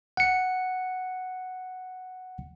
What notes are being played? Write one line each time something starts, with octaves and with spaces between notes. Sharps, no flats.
F#5 C#7